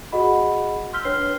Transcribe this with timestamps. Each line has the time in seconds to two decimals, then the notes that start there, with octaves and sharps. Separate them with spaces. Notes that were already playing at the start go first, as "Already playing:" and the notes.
0.12 F#4 G#4 D#5 F#5 B5
0.93 C6 E6 F6 G6 B6 G7
1.05 D4 B4 C#5 F6 C7 G7